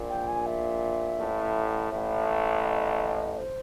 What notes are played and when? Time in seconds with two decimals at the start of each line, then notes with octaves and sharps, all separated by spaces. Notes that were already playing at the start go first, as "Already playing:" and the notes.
Already playing: A#1 A#2
0.09 G5
0.28 G#5
0.46 E5
1.19 A1 A2
1.91 A1 A2 E5
2.64 D#5
3.38 C5